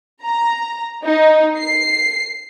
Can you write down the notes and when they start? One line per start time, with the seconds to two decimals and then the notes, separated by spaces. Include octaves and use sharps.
0.24 A#5
1.04 D#4
1.58 C7